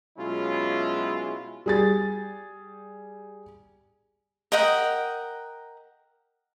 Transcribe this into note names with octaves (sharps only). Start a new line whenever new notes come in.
B2 F#3 G#3 C#4 E4 F4
G3 G#4 A6
A#4 D#5 F#5 G5